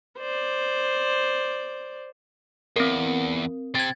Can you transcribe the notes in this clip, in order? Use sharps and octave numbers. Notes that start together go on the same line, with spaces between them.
C5 D5
E2 C4 A#4
C3 C4 G#6 A6